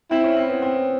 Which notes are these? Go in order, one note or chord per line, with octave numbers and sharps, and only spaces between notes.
C4 E4
C#4
C4
B3
C4